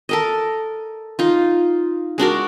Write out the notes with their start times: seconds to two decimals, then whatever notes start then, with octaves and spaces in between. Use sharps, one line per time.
0.09 A4 A#4 D#5
1.19 D#4 F4
2.18 G#3 D4 F#4 A#4